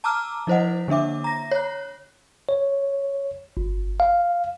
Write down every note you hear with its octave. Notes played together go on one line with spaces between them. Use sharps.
A5 A#5 D6 E6 F6
F3 E4 C5 D#5 F#5
D3 A#3 D4 E5 D6
A#5 A#6
C#5 F#6
C#5
G1
F5